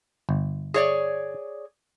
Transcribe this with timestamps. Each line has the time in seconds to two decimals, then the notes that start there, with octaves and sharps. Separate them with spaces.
0.29 G1
0.74 G#4 C#5 D5